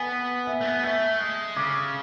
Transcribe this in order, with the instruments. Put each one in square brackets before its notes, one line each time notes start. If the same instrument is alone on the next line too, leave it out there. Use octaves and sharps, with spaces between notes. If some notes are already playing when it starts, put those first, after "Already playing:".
Already playing: [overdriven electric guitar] B3 [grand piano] G#5
[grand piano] E5
[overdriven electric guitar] A3
B3
[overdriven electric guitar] A3 [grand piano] E5
[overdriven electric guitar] G#3
[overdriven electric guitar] C#3 [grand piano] D6